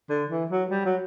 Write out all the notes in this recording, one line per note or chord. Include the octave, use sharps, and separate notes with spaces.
D3
E3
F#3
G3
F#3